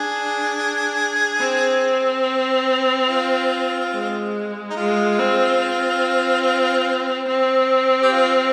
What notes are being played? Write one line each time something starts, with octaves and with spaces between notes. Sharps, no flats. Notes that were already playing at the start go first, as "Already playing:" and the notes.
Already playing: D4 G#4
C4
F4
G#3
D#4
G#3 F4
C4
C4
C4
G4
F4